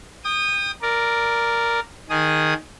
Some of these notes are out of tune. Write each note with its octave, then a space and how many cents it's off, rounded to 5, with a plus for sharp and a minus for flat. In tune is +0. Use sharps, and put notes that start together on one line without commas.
G5 +25 D#6 -15
A#4 +0 D5 +0
D#3 +0 G#4 +0 D#6 +0